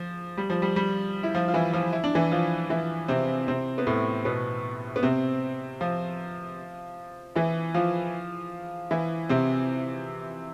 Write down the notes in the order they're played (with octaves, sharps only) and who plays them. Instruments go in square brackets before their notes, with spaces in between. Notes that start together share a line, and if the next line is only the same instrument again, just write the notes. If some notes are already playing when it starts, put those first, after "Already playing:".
Already playing: [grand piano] F3
G3
F3
G3
G3
E4
F3 F4
F4
E3 E4
F3 F4
E4
D4
E3 E4
F3 F4
E3 E4
C3 C4
C3 C4
B3
A2 A3
B2 B3
B3
C3 C4
F3 F4
E3 E4
F3 F4
E3 E4
C3 C4